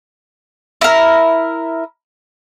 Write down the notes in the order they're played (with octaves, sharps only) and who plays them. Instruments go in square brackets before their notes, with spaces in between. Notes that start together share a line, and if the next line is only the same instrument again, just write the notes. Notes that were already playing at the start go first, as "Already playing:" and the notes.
[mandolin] E4 A#4